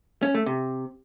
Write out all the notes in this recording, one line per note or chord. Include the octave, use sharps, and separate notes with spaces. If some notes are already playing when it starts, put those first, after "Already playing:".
C#4
A3
C3